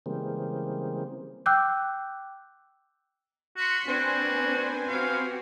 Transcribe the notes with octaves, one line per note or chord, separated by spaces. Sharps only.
C#3 E3 G3 G#3 A#3 C4
G5 D6 E6 F#6 G6
F#4 C6 B6 C#7
A#3 C4 D4 F#4 B4 C5 G#5
C4 F#4 G4 F5